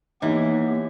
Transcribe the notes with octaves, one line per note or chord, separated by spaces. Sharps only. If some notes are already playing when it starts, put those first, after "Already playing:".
E3 A#3 B3 D#4 G4 C#5